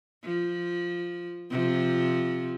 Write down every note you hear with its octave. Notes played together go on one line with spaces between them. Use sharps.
F3
C3 F3